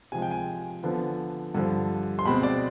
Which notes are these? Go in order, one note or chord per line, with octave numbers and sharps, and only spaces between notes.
C3 F3 G#3 G#5
G5
G#5
D3 F3 B3
G2 D3 F3
C6
B2 G#3 C4 B5
D5